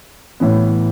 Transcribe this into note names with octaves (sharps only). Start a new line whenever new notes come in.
A1 A2 E3 B3